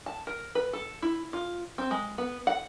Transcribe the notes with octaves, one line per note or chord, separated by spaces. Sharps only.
A5
A#4
B4
A4
E4
F4
C4
G#3
B3
F#5